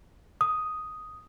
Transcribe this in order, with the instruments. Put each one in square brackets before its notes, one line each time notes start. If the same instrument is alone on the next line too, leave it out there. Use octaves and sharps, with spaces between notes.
[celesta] D#6